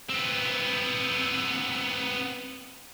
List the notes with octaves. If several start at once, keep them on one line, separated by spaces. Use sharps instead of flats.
B3 C4